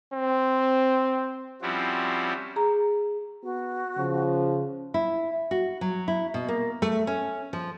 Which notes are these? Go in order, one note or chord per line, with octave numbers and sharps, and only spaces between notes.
C4
F3 G3 C4 C#4 E4 F#4
G#4 A#5
B3 F#4
C#3 F3
E4
F#4
F#3
E4
B2
A#3
A3
C#4
F3